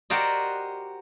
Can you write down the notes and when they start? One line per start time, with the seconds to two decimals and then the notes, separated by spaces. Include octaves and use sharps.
0.10 F#4 G4 A#4 C5 D5 D#5